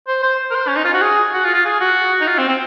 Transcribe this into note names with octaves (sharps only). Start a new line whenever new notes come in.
C5
C5
A#4
C5
C#4
D#4
F4
F#4
G#4
F#4
F4
F4
G#4
F#4
D#4
F4
C4
C4